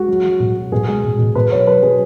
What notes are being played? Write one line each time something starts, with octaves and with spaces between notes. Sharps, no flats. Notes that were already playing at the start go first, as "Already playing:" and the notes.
Already playing: G#3 F#4
F#3
F#3
B2
F#3
B2 G#4
G#3
B2
B2
B2 B4
F#3 C#5
F#3 B4
F#3 G#4